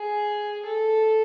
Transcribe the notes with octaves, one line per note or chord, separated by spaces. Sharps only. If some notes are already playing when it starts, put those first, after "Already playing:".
Already playing: G#4
A4